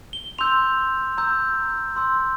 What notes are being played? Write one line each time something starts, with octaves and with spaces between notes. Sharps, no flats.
G7
C6 E6 G6 F7
A#5 E6 G6
C6 E6 G6